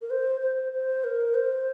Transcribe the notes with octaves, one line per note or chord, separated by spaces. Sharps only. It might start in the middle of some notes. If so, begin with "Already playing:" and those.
A#4
C5
C5
C5
A#4
C5